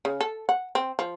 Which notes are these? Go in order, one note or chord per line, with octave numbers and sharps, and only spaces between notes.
C#3
A4
F#5
C4
F3